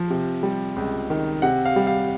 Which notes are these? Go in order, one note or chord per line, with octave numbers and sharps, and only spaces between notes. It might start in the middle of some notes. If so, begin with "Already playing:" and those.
Already playing: F3
C3
G3
C#2
D#3
C3 F#5
F5
G3
F5